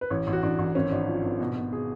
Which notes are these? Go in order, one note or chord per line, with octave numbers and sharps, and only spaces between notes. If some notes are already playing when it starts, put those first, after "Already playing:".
B4
A1 C#5
A1
F#4
A1 D4
A1
G#1 C#4
G#1 D4
F3
G#1
B2
B2
G#4